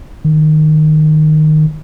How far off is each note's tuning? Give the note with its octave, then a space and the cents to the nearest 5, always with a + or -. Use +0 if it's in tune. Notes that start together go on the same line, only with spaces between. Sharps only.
D#3 -15